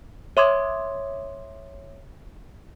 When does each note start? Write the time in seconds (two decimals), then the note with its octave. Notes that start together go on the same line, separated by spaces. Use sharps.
0.37 C#5 E5 C6 D6 D#6 G#6